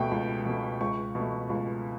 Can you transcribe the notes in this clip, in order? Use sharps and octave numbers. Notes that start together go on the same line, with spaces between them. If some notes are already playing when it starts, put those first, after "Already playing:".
Already playing: C#2 B2 A3 G5
C#2
B2 A3
C#2 C#6
B2 A3
C#2